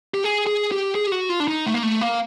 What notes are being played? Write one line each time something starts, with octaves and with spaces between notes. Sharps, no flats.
G4
G#4
G#4
G4
G#4
G4
F#4
F4
D4
D#4
A3
A#3
A3
A#3